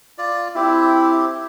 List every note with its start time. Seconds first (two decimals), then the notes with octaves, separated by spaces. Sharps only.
0.18 F4 D5
0.56 C4 E4 G4